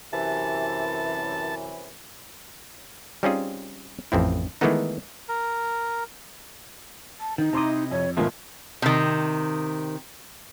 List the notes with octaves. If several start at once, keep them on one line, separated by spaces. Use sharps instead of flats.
F#2 C3 E3 A5
G3 C4 C#4 D#4 F4 G#4
A1 F2 C4 E4
D#3 E3 G#3 A3 B3 D#4
A#4
A5
D#3 D#4
C3 E4 D#5 A#5 C6 D6
F2 C#5
G1 A#2 F3 G#3 A3 F4 A#4
C3 D#3